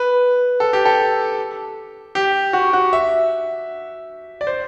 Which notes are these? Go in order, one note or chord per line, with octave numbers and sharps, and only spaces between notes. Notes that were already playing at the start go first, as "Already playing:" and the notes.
Already playing: B4
A4
G4
A4
G4
F#4
F#4
E5
D5
C5